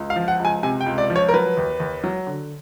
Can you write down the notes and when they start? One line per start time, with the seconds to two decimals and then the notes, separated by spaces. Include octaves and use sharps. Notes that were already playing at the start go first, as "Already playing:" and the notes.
Already playing: C#2
0.10 F5
0.16 F3
0.28 F#5
0.39 C#2
0.45 G#5
0.63 C3 G#5
0.81 G5
0.86 C#2
0.98 D5
1.10 F3
1.16 C#5
1.29 A#4
1.34 F#3 B4
1.57 D#2
1.80 D#2
2.04 F#3
2.27 D3